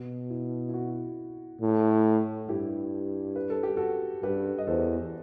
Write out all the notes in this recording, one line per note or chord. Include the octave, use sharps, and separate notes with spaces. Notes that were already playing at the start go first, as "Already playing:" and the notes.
Already playing: B2 F#4
E4
E4
F#4
A2
G2 E4 G4
B4
A4
G4
F#4 A4
G2 G4 B4
D#5
E2 A4 C5